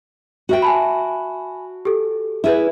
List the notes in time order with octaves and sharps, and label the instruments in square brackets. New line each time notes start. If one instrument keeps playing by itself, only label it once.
[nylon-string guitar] F#4 E5 G5
[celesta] G#5 A5 B5
G4 A4
[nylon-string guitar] E4 G#4 B4